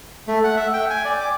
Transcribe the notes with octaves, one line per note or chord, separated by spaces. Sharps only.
A3
F#5
E5
G5
G#5
D5
D6